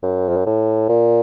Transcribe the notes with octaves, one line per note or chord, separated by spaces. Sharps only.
F#2
F2
F#2
A2
A#2